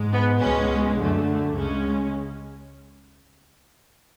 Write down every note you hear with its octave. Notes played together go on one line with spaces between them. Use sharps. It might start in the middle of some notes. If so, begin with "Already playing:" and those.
Already playing: G#2 G#3
B3
C#2 B2 G#3 C#4
F#2 D3 A3
C#2 C#3 G#3 C#4